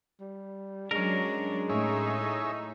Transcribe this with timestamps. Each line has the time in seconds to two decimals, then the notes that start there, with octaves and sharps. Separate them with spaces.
0.20 G3
0.91 F#3 G#3 C#4 D4 A#4
1.69 A2 D#4 G#4 C#5 E5